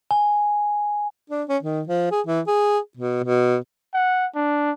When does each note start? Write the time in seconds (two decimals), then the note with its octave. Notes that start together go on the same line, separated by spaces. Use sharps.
0.11 G#5
1.30 D4
1.49 C#4
1.63 D#3
1.88 F3
2.11 G#4
2.27 E3
2.47 G#4
2.97 B2
3.24 B2
3.94 F#5
4.35 D4